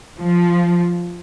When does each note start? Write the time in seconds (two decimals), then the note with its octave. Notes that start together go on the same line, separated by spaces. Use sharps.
0.18 F3